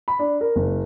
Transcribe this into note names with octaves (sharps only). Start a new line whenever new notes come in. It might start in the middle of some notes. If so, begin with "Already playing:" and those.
B5
D4
A#4
F#1